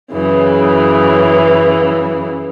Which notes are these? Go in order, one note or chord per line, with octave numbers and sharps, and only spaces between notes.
F#2 C#3 E3